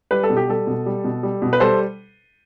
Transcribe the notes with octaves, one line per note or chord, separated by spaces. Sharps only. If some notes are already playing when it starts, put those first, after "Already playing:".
G3 B4
A4
B2
G4
G3 A4
B2
G3
B2
G3
B2
B4
G3 A4 C5